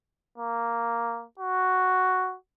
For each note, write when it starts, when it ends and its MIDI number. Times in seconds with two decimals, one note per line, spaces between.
0.38 1.25 58
1.39 2.36 66